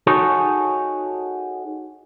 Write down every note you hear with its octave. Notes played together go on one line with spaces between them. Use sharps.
D#4 F#4 G#4 A4 C#5